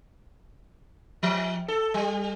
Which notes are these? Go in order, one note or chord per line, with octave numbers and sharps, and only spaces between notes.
F3
A4
G3